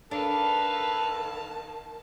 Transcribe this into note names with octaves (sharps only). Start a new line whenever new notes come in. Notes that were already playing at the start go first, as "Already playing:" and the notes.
D#3 D4 A4 B4 F5 A5